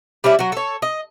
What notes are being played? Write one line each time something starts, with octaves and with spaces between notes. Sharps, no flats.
G3 C#4 D4 E4
F#3 F#4
A4 C#5
D#5